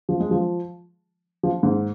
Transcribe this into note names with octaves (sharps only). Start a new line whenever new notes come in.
F3
G#3
F3
F3
G#2